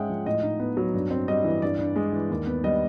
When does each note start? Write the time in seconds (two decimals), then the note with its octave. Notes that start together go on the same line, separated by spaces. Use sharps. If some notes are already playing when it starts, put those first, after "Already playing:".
Already playing: G#2 G#3 C#4 E5 F#5 G5
0.10 F3
0.26 A2 D#5
0.43 D#4
0.60 B3
0.77 F#3
0.94 G2
1.11 C4
1.28 G3 D#5
1.45 E3
1.62 G2 D5
1.79 G2
1.96 G#3
2.13 E3
2.30 D#2
2.47 B3
2.64 G3 D#5